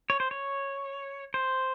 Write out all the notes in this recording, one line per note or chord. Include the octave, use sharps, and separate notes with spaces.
C#5
C5
C#5
C5